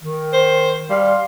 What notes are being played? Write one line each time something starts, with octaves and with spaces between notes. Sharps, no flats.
D#3
C5
G3 F5 C6